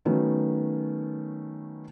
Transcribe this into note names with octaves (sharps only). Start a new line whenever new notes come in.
D#3 F#3 A3 B3 C#4